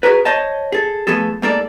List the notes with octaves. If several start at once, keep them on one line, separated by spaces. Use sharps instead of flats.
F#4 G#4 A#4 B4
C5 C#5 D#5 A5
G#4 A4
F3 A3 B3 G#4 A4
G#2 A#3 A4 D5